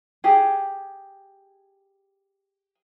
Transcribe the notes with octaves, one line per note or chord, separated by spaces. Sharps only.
G4 G#4